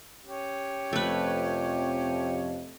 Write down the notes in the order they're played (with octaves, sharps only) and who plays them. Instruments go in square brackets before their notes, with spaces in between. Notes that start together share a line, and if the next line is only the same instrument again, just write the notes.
[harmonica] C#4 G4
[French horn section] F2 [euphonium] C3 [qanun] A3 B4